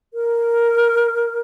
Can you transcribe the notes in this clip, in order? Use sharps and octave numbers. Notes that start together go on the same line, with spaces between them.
A#4